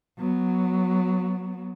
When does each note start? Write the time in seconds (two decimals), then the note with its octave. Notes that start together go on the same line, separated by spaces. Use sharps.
0.18 F#3 B3